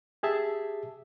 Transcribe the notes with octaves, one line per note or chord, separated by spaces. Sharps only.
G4 G#4 E5 A5